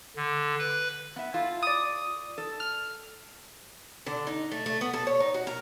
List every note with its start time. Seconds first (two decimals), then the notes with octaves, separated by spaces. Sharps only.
0.16 D3
0.58 B4
1.16 B3 E5
1.34 E4 F4 A4
1.63 D5 D#6
2.38 A4
2.60 F6
4.06 D3
4.27 D#4
4.51 A3
4.66 A3
4.81 B3
4.93 A4
5.07 C#5
5.20 D#4
5.34 F#4
5.47 A#4